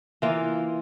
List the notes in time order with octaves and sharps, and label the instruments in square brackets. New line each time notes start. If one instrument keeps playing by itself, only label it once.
[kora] E3 A#3 F4